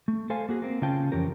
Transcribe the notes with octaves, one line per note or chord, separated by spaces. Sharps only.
A3
A4 C5 F5 G#5
A#3 F#4 G#4
A#3 C4
C#3 C#4 F4 F5 G5 A5
F2 E3 C#4 G4 A#4